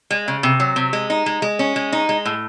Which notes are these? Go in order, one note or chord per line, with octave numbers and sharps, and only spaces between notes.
G#3
C#3
C3
F#3
C3
G#3
D#4
G#3
G#3
C#4
G#3
D#4
G#3
A2